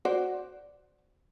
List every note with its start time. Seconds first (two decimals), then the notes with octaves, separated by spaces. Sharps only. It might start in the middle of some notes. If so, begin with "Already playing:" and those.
0.05 F#4 C5 D5